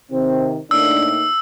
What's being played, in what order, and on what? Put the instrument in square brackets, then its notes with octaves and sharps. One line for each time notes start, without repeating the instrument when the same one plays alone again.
[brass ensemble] C3 D#3 [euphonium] C4
[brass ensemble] A2 A#3 D#4 [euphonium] D4 [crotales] E6